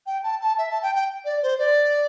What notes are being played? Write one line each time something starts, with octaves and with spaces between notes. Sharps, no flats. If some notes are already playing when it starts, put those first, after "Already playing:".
G5
A5
A5
E5
A5
G5
G5
D5
C5
D5